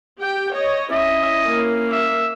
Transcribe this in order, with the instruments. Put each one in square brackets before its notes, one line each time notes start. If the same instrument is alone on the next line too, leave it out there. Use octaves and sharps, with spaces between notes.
[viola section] G4 G5
C#5 D#5
[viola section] C#4 E4 [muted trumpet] D#5 [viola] E5
[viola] A#3
[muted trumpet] E5